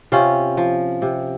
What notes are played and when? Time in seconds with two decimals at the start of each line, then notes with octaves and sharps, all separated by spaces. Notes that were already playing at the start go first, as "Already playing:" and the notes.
0.12 C3 C#4 F4
0.57 F3
1.02 C3